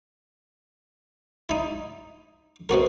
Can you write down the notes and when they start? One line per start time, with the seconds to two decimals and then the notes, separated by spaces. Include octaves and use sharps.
1.49 D#4 E4
2.69 B2 C4 F#4 A#4